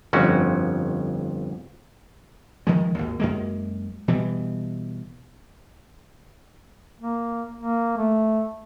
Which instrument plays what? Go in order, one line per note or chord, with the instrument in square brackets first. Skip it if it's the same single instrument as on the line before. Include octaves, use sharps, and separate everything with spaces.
[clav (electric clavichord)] G1 F2 C#4 F#4
[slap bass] D#3 F3 G#3
G#1 D#2
F#2 G#3 A#3
B2 E3 G3
[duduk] A#3
A#3
A3